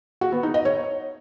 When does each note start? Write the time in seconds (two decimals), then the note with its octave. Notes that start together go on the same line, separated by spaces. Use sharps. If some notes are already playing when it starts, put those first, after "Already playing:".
0.21 F#4
0.32 B3
0.43 D#4
0.54 D#5
0.65 C#5